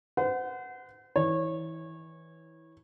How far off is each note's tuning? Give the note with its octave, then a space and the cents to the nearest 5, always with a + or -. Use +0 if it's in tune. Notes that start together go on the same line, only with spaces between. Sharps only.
C5 -40 F#5 +0
E3 -20 C#5 -25